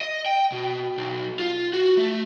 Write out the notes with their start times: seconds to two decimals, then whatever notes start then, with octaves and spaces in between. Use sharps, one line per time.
0.01 D#5
0.26 G5
0.52 B2
0.97 B1
1.39 F4
1.73 F#4
1.97 A3